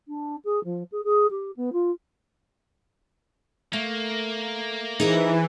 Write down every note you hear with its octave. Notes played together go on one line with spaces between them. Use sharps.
D4
G#4
F3
G#4
G#4
G4
B3
F4
A3 A#3
E3 D#4 E4 G#4 A#4 C5